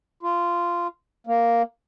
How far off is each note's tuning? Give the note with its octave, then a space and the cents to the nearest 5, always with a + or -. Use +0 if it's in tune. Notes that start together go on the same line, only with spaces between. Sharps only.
F4 -15
A#3 +0